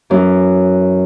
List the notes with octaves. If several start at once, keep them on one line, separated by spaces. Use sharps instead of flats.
F#2 E3